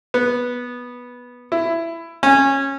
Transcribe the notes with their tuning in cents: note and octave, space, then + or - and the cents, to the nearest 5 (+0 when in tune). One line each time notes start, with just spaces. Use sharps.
B3 -10
E4 +15
C#4 -15